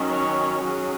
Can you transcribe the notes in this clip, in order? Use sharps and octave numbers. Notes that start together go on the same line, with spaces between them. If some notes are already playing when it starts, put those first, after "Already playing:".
Already playing: D#3 F#3 C#4
C#5
F#3 C#4 G#4